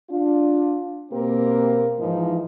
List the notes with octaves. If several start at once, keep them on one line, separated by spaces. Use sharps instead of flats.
D4 F4
B2 A#3 C4 G4 A#4
G#2 E3 F3 D#4 E4